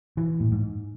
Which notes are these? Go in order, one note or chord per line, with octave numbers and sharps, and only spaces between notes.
E3
A2
G#2